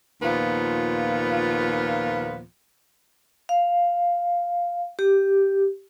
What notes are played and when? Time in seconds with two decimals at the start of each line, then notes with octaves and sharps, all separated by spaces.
0.22 D#2 A#2 F3 B3 F4
3.49 F5
4.99 G4